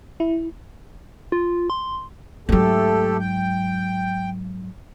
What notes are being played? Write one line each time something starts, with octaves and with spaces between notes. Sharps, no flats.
E4
F4
C6
G#2 F#3 A3 G4 A4
G5